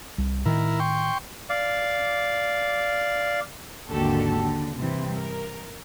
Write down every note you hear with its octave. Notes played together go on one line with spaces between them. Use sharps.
C2
A2 D#3 E4 A#4
G5 C6 C#6
D5 F5
G#1 D#2 D3 F#4 G4 A4
D3
G2 C3 E3 C4
A#4